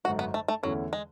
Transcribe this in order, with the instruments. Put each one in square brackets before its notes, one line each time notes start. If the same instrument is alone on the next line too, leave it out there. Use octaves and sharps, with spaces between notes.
[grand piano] G#1 F#2 D3 [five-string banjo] F#4
[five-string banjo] B3
A3
A3
[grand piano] E2 D3 A3 C#4 E4 [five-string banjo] F#3
[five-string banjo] G#3